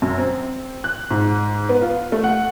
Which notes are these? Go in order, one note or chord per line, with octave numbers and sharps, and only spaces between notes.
F#2
C4
F#6
G#2
B3
F4
A3
F#5